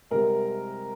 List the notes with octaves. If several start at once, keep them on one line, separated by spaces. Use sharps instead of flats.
C2 C3 G#3 C4 A#4 A#5